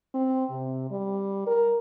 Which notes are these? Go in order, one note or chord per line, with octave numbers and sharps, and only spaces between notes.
C4
C3
G3
A#4